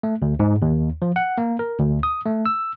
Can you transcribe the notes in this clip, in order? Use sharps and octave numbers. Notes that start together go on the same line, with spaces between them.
A3
D2
G#2
D#2
F3
F#5
A#3
A#4
D2
D#6
A3
E6